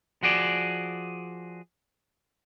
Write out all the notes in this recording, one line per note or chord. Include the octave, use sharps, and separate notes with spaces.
F3 F#4 G#4 D5